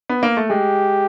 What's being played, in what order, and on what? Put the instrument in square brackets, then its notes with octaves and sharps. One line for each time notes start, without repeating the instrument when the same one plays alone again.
[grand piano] B3
A#3
A3
[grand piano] G#3 [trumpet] G4